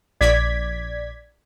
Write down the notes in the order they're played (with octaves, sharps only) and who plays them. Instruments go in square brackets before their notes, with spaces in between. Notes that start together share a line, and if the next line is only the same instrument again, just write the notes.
[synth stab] A#1 D5 G#6 B6